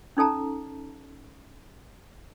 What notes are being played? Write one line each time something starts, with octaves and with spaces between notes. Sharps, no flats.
C#4 D#4 A4 A5 A#5